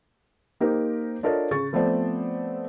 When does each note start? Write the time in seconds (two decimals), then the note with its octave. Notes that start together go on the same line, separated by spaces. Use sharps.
0.60 A#3 D#4 G4 A#4 C5
1.23 D4 F4 A4 A#4 C#5 D#5
1.51 C#3 C#6 A6
1.73 F3 A3 B3 C4 C5 D5